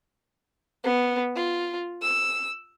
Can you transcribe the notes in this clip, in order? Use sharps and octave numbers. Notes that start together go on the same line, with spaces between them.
B3
F4
E6